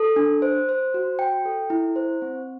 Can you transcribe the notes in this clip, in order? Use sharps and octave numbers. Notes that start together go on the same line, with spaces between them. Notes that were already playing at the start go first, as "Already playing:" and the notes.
Already playing: A4
D4
C5
C5
F#4
G5
A4
E4
C5
C4